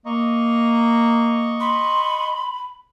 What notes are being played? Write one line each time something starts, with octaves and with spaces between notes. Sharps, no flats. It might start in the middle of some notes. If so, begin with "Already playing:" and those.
A#3 D#5 C#6
B5 C6